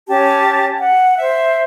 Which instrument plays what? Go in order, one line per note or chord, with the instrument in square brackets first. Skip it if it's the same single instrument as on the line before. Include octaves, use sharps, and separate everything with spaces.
[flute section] C#4 G4 C#5 A5
F#5
C5 E5